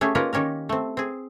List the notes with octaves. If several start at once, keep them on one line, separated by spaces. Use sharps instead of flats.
A3 C#4 G4 G#4
A#3 C#4 D#4 F4 A#4 B4
D#3 C#4 G4 A#4
A3 C4
C4 G#4